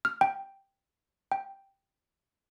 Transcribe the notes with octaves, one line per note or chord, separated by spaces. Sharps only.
F6
G5
G5